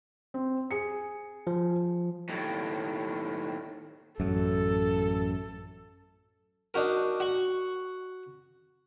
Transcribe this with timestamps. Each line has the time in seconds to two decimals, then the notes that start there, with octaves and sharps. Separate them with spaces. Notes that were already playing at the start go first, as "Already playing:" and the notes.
0.34 C4
0.71 G#4 C#7
1.47 F3
2.29 D#2 A2
4.20 A1 F#2 A4
6.74 D4 D#4 F#4 A#4
7.20 F#4 F#5 C#6